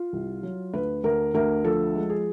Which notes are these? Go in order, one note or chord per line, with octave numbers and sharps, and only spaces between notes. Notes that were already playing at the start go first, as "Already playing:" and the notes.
Already playing: F4
C2
F#3
D2 B4
D2 A#4
D2 A#4
F3 A4
G#3
G#4